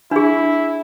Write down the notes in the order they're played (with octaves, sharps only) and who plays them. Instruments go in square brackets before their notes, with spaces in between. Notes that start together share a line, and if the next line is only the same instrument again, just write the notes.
[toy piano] D4 G#4 [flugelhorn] E4